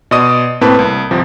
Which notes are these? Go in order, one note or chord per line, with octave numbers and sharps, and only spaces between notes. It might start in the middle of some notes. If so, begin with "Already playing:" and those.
B2 D5 D#5 C6 D#6 D#7
A2 A#3 C4 B4 A5
C2
G1 C3 F3